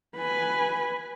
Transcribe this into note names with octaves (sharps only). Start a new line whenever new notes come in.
B4 G#5